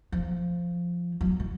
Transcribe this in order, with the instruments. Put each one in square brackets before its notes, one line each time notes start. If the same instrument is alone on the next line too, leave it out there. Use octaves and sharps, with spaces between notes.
[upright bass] F3
F#3
F#3